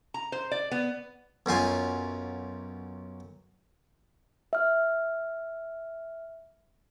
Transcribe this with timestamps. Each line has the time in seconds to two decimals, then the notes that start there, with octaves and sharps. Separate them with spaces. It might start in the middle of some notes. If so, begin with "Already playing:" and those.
0.14 A#5
0.32 C5
0.51 D5
0.71 B3
1.46 B1 F#2 F4 G#5
4.53 E5 F6